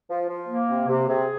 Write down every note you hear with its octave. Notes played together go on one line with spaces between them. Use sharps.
F3
F3
A#3
C3
C3
C3 G#4